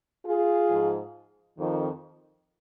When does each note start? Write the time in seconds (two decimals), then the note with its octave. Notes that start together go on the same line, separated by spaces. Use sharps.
0.23 F4 G#4
0.67 G#2 F3
1.57 F2 D#3